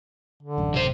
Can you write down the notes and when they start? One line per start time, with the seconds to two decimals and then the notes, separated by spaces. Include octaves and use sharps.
0.43 D3
0.58 A1 F#2
0.74 C3 C5